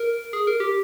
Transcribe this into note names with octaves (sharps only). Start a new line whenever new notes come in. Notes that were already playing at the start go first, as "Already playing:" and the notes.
Already playing: A#4
G#4
A#4
G4